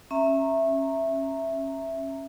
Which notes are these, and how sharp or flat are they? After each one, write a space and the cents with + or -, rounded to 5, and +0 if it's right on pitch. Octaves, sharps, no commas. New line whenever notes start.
C#4 -25 E5 +0 A#5 -15